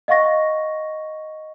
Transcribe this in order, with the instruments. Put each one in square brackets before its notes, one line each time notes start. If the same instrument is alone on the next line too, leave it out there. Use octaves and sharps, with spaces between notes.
[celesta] D#5 F5 F#5 C#6 A#6